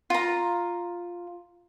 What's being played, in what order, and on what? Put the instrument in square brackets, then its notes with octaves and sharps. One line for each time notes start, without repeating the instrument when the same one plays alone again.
[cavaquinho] F4 A#5